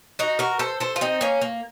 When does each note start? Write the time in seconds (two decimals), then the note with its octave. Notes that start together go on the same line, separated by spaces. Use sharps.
0.19 D#4 F#4
0.39 F#4 A#4
0.59 A4 C5
0.80 A4 C5
0.96 F4
1.01 C4 D#4
1.21 A#3 C#4
1.41 A#3